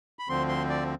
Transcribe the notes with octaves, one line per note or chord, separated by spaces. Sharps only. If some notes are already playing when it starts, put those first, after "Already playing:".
B5
D2 D3 F3 C4 C6
C6
D5